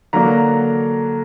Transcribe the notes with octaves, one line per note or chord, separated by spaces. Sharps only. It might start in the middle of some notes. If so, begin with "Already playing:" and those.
D3 F#3 A#3 D4 A#5